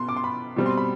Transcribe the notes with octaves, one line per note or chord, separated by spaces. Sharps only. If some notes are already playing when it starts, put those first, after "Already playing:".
Already playing: B2 B3 C6
D6
C6
B5
B2 G3 C4
C6
B5